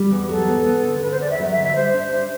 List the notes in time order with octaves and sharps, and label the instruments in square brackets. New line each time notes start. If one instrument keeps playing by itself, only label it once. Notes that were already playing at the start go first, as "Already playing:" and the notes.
Already playing: [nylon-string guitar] G3
E2
[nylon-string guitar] F#3 [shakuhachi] A4
[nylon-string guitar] B3
B3
D3
[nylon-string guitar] D3 [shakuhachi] B4
[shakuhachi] C5
[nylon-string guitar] E2 [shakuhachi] D5
[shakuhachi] E5
[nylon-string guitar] F#3
[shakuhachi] E5
[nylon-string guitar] D3
[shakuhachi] E5
[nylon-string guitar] G3 [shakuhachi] C5
[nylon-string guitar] D4
D4